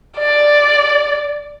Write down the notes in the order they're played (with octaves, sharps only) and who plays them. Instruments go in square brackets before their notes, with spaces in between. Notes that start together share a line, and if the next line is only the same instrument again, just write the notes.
[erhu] D5